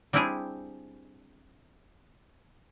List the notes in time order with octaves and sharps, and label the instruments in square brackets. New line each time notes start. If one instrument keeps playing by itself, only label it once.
[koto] G3 C4 D4 E4 G4 G#4